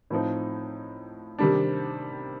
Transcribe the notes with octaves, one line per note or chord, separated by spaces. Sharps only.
A2 F3 C4 D#4
C3 D#3 G3 D4